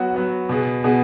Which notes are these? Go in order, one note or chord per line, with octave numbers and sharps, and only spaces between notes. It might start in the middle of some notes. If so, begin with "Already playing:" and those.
Already playing: F#3 B3 F#4
F#3 B3 F#4
B2 B3 G#4
B2 B3 G#4